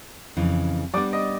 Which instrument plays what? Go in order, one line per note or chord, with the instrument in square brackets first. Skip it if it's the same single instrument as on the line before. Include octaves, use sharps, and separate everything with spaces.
[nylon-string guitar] F2 C#3 E3
[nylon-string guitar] G3 B3 D4 [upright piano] D5 D6
[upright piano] D#5 D#6